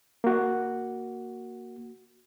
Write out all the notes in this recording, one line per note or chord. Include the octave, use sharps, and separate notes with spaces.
A#3 F#4